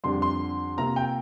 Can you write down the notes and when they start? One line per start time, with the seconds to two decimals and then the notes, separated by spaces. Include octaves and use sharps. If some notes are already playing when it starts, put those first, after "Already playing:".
0.04 F2 D3 G3 D4 C6
0.22 C6
0.77 C3 A#3 F4 A#5
0.96 G5